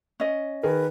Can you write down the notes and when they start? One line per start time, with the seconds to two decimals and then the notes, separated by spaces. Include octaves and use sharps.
0.20 C#4 D#5
0.63 D#3 G#4 A#4 B4